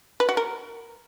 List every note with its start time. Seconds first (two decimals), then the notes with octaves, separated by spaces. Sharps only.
0.20 B4
0.29 F#4
0.37 A#4